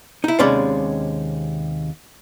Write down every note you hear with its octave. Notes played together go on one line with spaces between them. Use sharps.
D#4 E4
D#2 C3 G#3 C#4 D5 B5